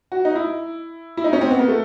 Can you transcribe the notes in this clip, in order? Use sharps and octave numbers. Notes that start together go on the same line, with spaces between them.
F#4
D#4
E4
E4
D#4
C#4
C4
B3
A#3
A3